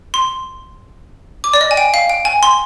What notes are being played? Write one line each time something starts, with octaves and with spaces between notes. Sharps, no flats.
C6
D6
D5
D#5
G#5
G5
F5
G5
G#5
C6